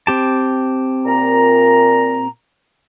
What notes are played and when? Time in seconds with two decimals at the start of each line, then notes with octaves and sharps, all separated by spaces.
0.07 C4 G4 A5
1.05 A#2 A#5